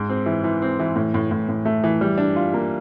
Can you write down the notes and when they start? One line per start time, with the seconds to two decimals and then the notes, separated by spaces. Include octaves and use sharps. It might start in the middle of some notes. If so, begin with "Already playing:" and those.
Already playing: G#2
0.09 C4
0.26 E3
0.44 E3
0.62 C4
0.79 E3
0.96 A2
1.14 A2
1.31 A2
1.49 A2
1.65 A3
1.84 E3
2.01 G3
2.18 D4
2.36 F4
2.54 A#3